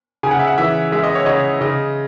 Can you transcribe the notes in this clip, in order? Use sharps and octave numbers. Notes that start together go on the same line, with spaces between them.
C#3 G#5
F#5
E5
F#5
E3 E5
G#3 E5
D#5
C#5
C#3 D#5
C#3 D#5